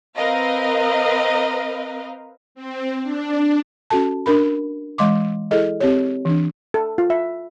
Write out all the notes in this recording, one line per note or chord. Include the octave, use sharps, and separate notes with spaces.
C4 A#4 B4 D#5 F5
C4
D4
C#4 F#4 A4 A5
D4 A#4 B5
E3 G#3 D#5 C6 D6
E4 G#4 A4 D#5
C4 G4 C#5
E3 D4
A4
F4
E5